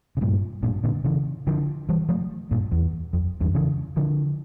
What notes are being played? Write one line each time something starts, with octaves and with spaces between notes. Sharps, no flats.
C#3
G2 A#2
G2 A#2
A#2 D3
C#3 E3
D3 F3
E3 G3
F3 A3
G2 A#2
E2
F2
E2 G2
C#3 E3
D3 F3